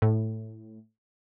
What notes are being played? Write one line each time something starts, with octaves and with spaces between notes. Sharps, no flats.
A2